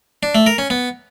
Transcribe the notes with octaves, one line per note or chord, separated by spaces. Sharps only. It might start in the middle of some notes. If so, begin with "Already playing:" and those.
D4
A3
A#4
C#4
B3